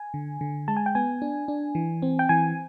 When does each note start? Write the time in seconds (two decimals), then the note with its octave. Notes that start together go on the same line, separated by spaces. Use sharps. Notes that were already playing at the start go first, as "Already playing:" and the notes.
Already playing: G#5
0.14 D3
0.41 D3
0.68 G#3 A5
0.76 G#5
0.86 G5
0.95 B3 G#5
1.22 D4
1.48 D4
1.75 E3
2.02 C4
2.19 G5
2.29 E3 G#5